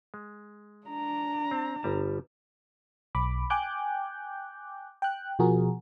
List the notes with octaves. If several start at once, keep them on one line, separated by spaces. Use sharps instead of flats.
G#3
D4 A#5
C4
G1 G3 A5
B1 B5 D6
G5 G#5 D6 F#6 G6
G5 F#6
B2 F3 F#4 G#4 A#4